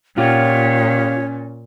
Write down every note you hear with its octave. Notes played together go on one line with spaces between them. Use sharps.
A#2 C#4 F4 G4 C#5